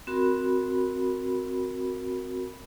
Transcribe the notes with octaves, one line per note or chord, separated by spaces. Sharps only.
C4 F#4 A#4 B5